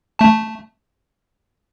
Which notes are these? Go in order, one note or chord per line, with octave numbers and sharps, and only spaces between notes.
A3 A5